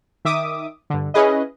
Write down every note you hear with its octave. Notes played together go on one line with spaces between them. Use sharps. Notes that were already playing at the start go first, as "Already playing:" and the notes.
D#3 E5 D6 D#6
G2 D3
C#4 E4 G#4 B4 D#5